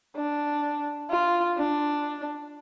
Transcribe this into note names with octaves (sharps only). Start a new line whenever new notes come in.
D4
F4
D4